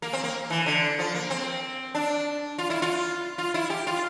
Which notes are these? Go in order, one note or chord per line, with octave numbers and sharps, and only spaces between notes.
A#3
C4
A#3
E3
D3
F3
A#3
C4
D4
F4
E4
F4
F4
E4
G4
F4